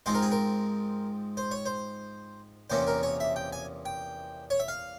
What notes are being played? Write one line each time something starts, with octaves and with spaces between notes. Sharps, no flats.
G#2 F3 G#3 C4 C5
A#4
G#4
A#4
C5
C#5
C5
E2 C3 F3 A#3 C#4 C5
A#4
C#5
E5
G5
G#5
G5
C#5
E5
F5